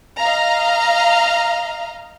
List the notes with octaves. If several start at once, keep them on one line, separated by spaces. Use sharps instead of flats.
D#5 F5 A#5